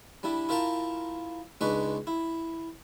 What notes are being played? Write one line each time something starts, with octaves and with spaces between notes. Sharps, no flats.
G3 D4 E4
E4 F4 A#4 G5 A5 A#5
C#2 G#3 D4 D#4 B4 C#6
E4